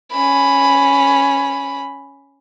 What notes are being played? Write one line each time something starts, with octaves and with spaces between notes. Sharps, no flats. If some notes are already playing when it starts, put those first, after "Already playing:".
C#4 B5